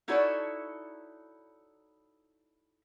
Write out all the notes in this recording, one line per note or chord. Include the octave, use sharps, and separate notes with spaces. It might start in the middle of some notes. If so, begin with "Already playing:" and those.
D#4 E4 F#4 A4 C#5 D5